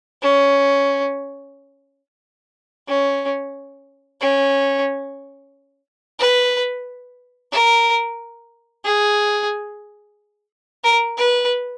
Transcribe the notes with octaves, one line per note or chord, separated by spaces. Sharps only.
C#4
C#4
C#4
B4
A#4
G#4
A#4
B4